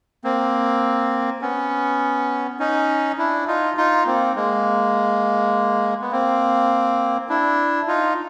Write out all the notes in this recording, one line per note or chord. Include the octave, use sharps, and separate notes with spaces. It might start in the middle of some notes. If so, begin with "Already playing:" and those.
A#3 C4
B3 C#4
C#4 D#4
D4 E4
D#4 F4
D#4 F4
A#3 C4
G#3 A#3
B3
A#3 C4
D4 E4
D#4 F4